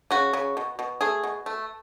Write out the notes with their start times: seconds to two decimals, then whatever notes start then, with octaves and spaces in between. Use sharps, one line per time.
0.11 C#3 F#4
0.33 C#3
0.57 B2
0.79 B2
1.01 A3 G#4
1.24 B2
1.46 A3